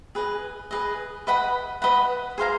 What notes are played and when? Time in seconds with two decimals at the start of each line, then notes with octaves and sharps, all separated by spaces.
0.15 G#4 B4 D#5
0.71 G#4 B4 D#5
1.27 B4 D#5 F#5 B5
1.82 B4 D#5 F#5 B5
2.38 G#4 C5 F5 A#5